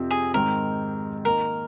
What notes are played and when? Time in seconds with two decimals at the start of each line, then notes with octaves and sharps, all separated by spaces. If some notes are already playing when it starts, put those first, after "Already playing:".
Already playing: F2 C3 F3 C4
0.11 G#4
0.34 G#2 D#3 C4 A#4
1.25 D#3 A#3 D#4 A#4